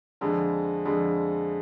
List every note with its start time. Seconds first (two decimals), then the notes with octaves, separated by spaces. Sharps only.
0.21 F2 D3 G#3
0.85 F2 D3 G#3